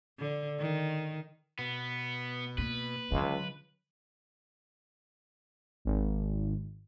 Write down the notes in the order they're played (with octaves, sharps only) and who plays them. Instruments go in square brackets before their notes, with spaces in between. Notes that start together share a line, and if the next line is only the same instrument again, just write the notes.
[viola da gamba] D3
D#3
[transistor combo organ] B2 [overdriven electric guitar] B3
[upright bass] A#3 [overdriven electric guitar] B4
[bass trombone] C#2 [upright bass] D3 F#3
[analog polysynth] G#1